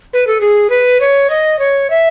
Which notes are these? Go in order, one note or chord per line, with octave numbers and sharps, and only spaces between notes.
B4
A4
G#4
B4
C#5
D#5
C#5
E5